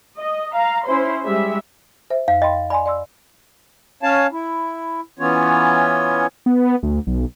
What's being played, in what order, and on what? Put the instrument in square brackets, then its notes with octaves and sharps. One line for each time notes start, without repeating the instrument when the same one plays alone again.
[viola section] D#5
F5 A#5
C#4 E4 C5 C6
G3 G#3 E5
[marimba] C5 E5
[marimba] F2 [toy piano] F5
[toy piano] D#5 [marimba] G5 B5 C6
[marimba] D5 G#5 C6 [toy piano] B5
[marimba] D5 C6 E6
[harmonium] C#4 C#5 F5 A5
E4
E3 B3 C#4 F4 C#5
[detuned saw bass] B3
D2
B1